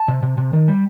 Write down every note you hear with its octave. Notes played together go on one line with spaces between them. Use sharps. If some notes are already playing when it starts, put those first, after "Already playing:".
Already playing: A5
C3
C3
C3
D#3
G3